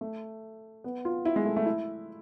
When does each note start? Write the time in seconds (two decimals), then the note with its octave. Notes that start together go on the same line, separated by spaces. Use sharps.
0.01 A3
0.84 B3
1.05 F4
1.25 E4
1.36 G#3
1.45 A3
1.56 A3
1.66 E4